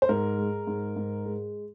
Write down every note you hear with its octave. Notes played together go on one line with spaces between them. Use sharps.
C5
G#2 A#4
G#3
G#2
G#2
G#3